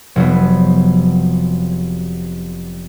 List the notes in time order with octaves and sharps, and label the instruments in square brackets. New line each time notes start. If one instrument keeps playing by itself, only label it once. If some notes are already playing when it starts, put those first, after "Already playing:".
[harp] F1 F#3 B3